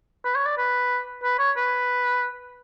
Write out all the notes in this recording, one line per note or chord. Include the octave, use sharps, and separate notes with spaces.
B4
C#5
D5
B4
B4
C#5
B4